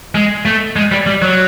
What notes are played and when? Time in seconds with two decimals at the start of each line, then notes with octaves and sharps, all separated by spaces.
0.15 G#3
0.45 A3
0.76 G#3
0.92 G3
1.06 G3
1.22 F#3